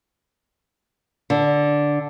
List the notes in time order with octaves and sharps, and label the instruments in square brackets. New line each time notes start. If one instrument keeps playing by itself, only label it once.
[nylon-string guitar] D3